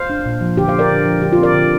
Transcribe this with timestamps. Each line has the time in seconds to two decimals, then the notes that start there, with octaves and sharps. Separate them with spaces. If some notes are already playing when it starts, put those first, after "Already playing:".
Already playing: C5 F5
0.10 D4
0.26 A#2
0.41 F3
0.57 D3 G4
0.68 C5 F5
0.74 D4
0.79 A#4 D5
0.90 D3
1.06 F3
1.22 D3 G4
1.32 F4
1.38 C4
1.43 A#4 D5
1.54 D3